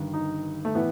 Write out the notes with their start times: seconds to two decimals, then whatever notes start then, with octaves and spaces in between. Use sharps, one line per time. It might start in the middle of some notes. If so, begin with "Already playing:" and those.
Already playing: G1 G2 D#3
0.14 D#4
0.65 A3
0.75 A2 E3 B3